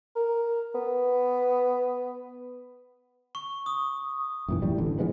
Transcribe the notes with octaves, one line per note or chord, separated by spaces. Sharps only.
A#4
B3
C#6
D#6
F#2 A#2 E3
A1 A2 E3 G3
A1 D3
E3 F3 G#3 B3